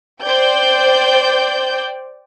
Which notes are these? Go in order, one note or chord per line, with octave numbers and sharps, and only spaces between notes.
C5 D5 G5 G6